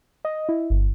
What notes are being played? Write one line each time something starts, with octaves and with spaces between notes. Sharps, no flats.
D#5
E4
G1